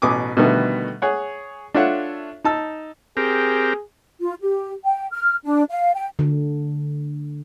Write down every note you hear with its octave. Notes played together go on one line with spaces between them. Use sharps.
A1 B2 G#5 D6 D#6
B2 D3 D#3 G3 A3 B3
G#4 C#5 F#5
D4 F4 A4 C#5 E5 F#5
D#4 A5 E6
C4 G4 G#4 A#4
F4
G4
G5
F6
D4
F5
G5
D3